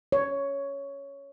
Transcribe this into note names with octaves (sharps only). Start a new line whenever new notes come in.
C#5